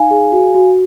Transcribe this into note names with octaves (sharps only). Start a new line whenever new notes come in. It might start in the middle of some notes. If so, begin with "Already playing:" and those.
Already playing: D#4 F5 G#5
G#4
F#4
F#4